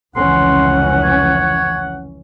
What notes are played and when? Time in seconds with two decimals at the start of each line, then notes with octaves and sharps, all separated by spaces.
0.16 F1 C#2 E3 C#4 F#5 C6
1.03 C#5